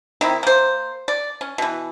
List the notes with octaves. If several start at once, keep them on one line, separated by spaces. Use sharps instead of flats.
D#3 C4 D#4 E4
A#3 C5
D5
C#4
B2 E3